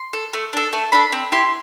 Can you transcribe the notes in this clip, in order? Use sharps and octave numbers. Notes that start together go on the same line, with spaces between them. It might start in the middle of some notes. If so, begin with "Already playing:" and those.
Already playing: C6
A4
A3
D4 A4
A3 A5
D4 A4 B5
C4
E4 G4 C6